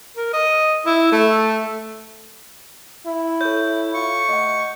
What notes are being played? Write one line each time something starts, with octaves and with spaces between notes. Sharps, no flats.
A#4
D#5
E4
A3
E4
A4 C#5 G6
F4 C#6
A3 D#5 F#5